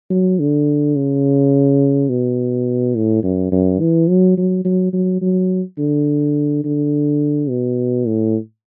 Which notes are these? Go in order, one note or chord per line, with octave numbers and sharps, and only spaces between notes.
F#3
D3
C#3
B2
A2
F#2
F#2
E3
F#3
F#3
F#3
F#3
F#3
D3
D3
B2
A2